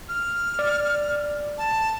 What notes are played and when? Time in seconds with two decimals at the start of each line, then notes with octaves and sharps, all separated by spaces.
0.09 F6
0.59 D5
1.58 A5